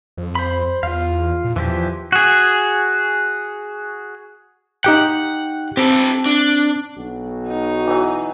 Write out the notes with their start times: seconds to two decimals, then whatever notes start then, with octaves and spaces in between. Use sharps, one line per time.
0.17 F2
0.35 C5 B5
0.83 E2 F4 F5
1.45 A#2
1.56 E2 E3 F3 G4
2.12 F#4 G#4
4.84 D#4 G4 F#5 G5
5.77 C4 G4 A4
6.26 D4
6.98 B1 F#4
7.47 D#4
7.87 E3 F#3